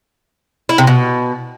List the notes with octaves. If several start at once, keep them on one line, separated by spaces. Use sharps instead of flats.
E4
C3
B2